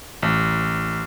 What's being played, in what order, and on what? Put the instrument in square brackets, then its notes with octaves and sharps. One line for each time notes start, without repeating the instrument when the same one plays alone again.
[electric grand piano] A1